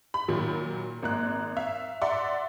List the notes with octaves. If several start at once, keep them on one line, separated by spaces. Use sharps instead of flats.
B5
A#2 D#3 F#3
G#1 A#3 F#6
E5 F5
D5 E5 F#5 C6